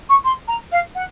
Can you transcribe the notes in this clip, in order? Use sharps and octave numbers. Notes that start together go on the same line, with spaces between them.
C#6
C6
A#5
F5
F#5